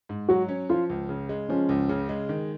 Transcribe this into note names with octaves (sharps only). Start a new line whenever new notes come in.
G#2
F#3 F#4
C#4
F3 F4
C#2
C#3
G#3
F3 C#4
C#2
C#3
G#3
D#3